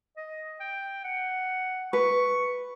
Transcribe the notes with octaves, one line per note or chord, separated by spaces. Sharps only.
D#5
G5
F#5
B4 C#6